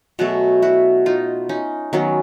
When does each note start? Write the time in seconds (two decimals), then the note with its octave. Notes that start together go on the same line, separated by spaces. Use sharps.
0.19 B2 F#3 A3 F#4 G#4
0.62 E4 F#4
1.06 D#4 F4
1.49 C#4 D#4
1.93 D#3 F#3 B3 C#4